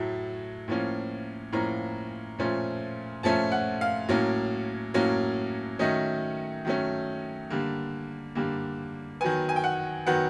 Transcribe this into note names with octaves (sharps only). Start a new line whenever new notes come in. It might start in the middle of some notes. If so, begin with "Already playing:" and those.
Already playing: A2 F#3 A3
A2 F3 A#3 C#4
A2 F3 A#3 C#4 A#5
A#2 F3 A3 C#4
A#2 F3 A3 C#4 A5
F#5
F5
A2 F#3 A#3 C#4
A2 F#3 A#3 C#4
D#3 F#3 A3 C#4 D#5
D#3 F#3 A3 C#4
D3 G3 A#3
D3 G3 A#3
D#3 F#3 B3 G#5
G#5
G5
F#5
D#3 F#3 B3 F#5